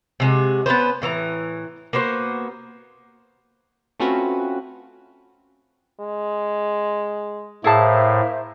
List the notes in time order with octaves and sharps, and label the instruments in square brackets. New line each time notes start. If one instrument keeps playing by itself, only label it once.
[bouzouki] C3 G#3 F#4
B3 C#4 B4 C5
A2 E3 G4 A#5
A#3 B3 F#4 C5
[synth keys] A3 C4 C#4 F4 F#4 B4
[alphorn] G#3
[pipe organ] A2 [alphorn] A#3 [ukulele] E4 G#4 A5 [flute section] C5 E5